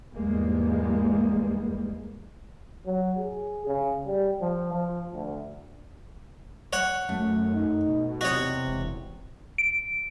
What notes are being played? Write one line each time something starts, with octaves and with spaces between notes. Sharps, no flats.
E2 G#2 G3 G#3 A#3 B3
F#3
G#4
C#3
G3
F3
F3
D2
C#5 F#5
F#2 A3
D#4
B2
E2 C3 F#4 C#5 D#5
E1
D7